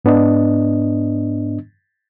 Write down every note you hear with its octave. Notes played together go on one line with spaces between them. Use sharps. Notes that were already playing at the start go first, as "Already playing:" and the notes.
G#2 B3 D4 D#5